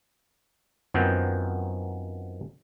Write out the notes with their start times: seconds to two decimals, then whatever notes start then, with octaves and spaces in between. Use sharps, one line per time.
0.94 F#2 D#3 F3 B3 C4